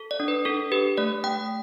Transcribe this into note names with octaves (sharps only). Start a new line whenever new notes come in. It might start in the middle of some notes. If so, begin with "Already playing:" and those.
Already playing: A4
D5
D4
B4
D4 A4
G4 B4
A3 D5
A3 G5